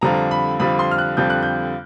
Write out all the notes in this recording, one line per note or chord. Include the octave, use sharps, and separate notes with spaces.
F2 D3 G3 C4 F4 A#5
B5
F2 D3 G3 C4 F4 B5
C6
F6
F#6
F2 D3 G3 C4 F4 G6
F#6
G6